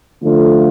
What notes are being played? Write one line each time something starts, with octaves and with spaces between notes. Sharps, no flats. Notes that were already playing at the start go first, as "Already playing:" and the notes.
D3 F3 A3 F4